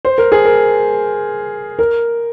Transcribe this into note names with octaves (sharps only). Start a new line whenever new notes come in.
C5
A#4
G#4
A#4
A#4